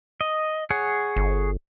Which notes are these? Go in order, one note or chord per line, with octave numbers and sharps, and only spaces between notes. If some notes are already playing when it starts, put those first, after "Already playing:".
D#5
G#4 C#5 F#5
G1